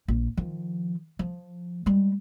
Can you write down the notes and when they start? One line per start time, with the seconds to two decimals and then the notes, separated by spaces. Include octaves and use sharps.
0.08 A#1
0.37 D#3 F3
1.19 F3
1.86 G3 G#3